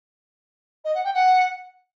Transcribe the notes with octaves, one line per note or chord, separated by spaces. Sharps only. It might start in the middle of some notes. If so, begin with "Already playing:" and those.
D#5
F#5
G5
F#5